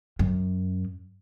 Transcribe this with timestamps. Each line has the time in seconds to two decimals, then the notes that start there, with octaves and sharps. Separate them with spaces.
0.19 F#2